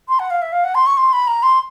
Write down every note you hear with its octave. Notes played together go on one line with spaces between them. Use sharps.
C6
F#5
F5
E5
F5
F#5
C6
C#6
C6
B5
A#5
C6